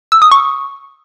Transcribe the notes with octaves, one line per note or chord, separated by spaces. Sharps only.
E6
D#6
C#6